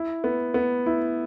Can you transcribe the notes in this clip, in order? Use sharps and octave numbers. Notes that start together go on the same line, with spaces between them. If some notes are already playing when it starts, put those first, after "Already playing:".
Already playing: E4
B3
B3
E4